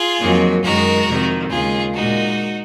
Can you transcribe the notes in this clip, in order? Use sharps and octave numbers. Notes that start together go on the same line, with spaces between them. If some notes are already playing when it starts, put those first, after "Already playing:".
Already playing: F4 G#4
F2 D#3 F#3 A#3
F#2 D#3 G#3 F#4 A#4
F2 C3 D#3
D#2 C#3 G#3 F4 G#4
A#2 G#3 D#4 F#4